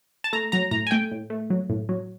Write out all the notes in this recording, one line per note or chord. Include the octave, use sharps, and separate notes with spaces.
A5
A3 A#5
F#3 A#5
A2 A#5
G#5
A3 G5
A2
A3
F#3
A2
F#3